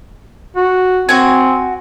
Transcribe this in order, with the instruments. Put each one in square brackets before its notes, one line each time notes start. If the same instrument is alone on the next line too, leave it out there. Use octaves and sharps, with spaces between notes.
[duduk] F#4
[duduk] C4 [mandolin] F#4 G#5